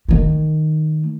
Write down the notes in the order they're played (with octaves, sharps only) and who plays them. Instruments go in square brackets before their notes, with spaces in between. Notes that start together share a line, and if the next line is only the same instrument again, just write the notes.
[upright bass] D#3 A3